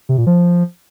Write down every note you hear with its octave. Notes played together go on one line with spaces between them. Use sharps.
C3
A#2
F3